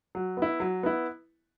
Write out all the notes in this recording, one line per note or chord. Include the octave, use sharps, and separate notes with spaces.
F#3
B3
E4
F#3
B3 E4